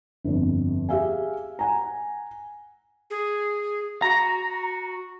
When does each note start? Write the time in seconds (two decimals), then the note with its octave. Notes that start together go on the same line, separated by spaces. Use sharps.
0.24 G1 F2
0.89 G4 G#4 E5 F5 G#5
1.59 F#5 G#5 A#5
3.10 G#4
4.02 F#4 A#5